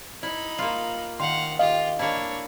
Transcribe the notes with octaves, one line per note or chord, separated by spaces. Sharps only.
D#4 E4 B5
A#3 F4
D#3 F5 F#5 C6
F4 G4 D#5 F5
A#3 D4 E4 C#5